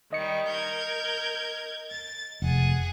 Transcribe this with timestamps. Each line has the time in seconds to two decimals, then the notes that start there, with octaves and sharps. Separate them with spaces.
0.13 D#3 G3 D#5 C#7
0.48 A#4 G6 G#6
1.90 A6
2.42 F1 G#4 F#5